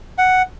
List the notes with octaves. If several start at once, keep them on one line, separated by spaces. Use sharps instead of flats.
F#5